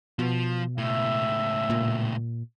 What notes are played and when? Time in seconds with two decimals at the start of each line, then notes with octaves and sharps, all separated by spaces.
0.19 B2 F3
0.78 C#2 A2 E5
1.70 A#2